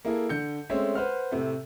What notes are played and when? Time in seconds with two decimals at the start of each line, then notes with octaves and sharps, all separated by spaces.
0.05 A#3 E4 G#4 A4
0.29 D3 G6 C#7
0.70 G#3 A3 C4 C#4 C#5 E5
0.95 B4 C5 F#5 F6
1.32 A2 C3 A3